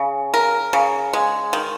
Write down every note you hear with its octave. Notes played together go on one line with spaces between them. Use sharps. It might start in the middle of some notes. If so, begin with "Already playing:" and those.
Already playing: C#3
A#4
C#3
G#3
D#3